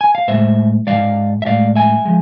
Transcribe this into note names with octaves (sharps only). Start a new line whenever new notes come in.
G#5
F5
A2 G#3 C5 E5
E3 G#3 D5 F5
G#2
E5
A2 G#3 D5 F5
E5 G#5
F3 G#3